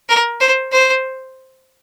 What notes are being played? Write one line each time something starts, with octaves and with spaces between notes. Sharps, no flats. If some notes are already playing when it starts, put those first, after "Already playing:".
A#4
C5
C5